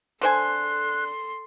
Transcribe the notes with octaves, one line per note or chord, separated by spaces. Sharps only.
D3 A4 C5 G#5 C6 F#6